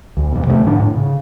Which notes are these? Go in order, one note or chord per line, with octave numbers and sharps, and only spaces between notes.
D2
F2 B2
C3 F3 G#3 A3
G#2 D3 D4
A2
C#3